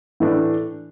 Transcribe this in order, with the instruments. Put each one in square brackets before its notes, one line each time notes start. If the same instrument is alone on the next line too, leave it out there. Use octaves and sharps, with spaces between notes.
[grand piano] A2 E3 A3 D4